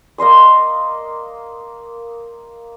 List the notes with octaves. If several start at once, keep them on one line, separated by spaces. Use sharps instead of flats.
A#3 D#5 C6 D#6